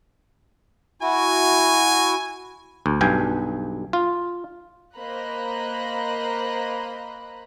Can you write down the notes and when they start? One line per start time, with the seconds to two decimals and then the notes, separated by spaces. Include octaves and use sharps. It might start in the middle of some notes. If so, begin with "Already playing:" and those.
1.02 E4 F#4 G#5
2.86 D2
3.01 B1 G2 G5 G#5
3.93 F4
4.95 A#3 C5 D#5 A#5 B5 F#6